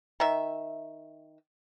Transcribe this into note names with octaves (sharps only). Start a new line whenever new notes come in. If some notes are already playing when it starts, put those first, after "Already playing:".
D#3 E5